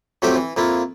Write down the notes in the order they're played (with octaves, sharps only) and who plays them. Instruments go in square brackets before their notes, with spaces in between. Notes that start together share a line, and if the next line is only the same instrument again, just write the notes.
[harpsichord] F2 F#3 A3 C4 G4 E5
E3
F2 A#3 E4 F4